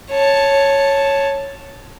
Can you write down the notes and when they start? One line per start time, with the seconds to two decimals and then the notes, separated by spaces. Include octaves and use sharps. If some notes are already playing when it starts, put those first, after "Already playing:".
0.11 C#5 A5